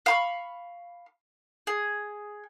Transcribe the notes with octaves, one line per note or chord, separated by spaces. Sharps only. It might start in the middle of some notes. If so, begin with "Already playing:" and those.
F5 B5 C#6
G#4